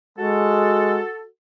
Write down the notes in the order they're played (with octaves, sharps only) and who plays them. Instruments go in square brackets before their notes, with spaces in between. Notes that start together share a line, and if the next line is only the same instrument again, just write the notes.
[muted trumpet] G#3 [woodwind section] F#4 A4